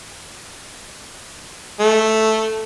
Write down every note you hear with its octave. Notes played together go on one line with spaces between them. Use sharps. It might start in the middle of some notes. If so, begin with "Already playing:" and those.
A3